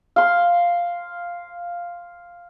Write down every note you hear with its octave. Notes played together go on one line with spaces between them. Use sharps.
F5 C6